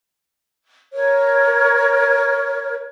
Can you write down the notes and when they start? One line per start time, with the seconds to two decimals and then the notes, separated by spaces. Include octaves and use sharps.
0.92 A#4 C#5